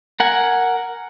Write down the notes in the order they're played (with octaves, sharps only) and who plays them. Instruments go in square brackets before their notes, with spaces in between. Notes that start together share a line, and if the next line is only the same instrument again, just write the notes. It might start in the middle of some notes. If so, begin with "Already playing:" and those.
[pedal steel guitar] A#4 F#5 G#5